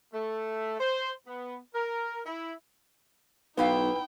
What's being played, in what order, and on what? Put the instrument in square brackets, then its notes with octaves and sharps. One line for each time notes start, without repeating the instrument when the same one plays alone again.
[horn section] A3
C5
B3
A#4
E4
[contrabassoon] B1 [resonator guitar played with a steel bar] B3 E4 F5 [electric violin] D#4 G5 [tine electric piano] B4